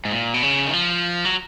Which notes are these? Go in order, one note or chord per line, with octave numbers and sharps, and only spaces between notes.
G#2
A#2
B2
C#3
D#3
F3
F#3